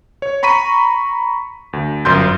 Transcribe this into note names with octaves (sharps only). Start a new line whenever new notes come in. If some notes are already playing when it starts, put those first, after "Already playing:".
C#5
A#5 B5 C#6 B6 D#7
D2
G1 F#2 C6 G6